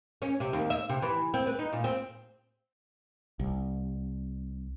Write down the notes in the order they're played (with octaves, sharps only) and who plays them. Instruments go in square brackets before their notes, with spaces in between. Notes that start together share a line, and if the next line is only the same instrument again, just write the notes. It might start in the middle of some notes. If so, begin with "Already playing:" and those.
[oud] C#4
C3
D#2
E5
C3
E3
C4
B4
D#4
A#2
C4
[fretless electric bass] C2